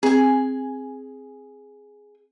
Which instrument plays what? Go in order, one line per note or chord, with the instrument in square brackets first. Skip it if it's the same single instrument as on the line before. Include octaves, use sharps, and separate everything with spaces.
[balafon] C4 [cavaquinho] G#4 G#5